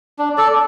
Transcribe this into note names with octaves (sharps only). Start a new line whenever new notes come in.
D4
A4 D5